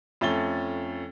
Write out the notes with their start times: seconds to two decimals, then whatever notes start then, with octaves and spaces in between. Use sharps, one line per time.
0.21 F2 A3 C#4 A6 G7